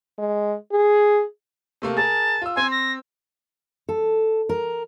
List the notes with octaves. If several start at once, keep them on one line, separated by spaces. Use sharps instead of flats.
G#3
G#4
C3 A3 A#3
G#4 A#4 A5
F4 E6
C4 G#5 C6
A#6
A4
A#4